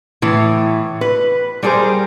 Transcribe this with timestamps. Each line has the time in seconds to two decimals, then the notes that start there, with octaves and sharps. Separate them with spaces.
0.22 A2 E3
1.01 B4
1.63 G3 G4 G#4 A#4 C5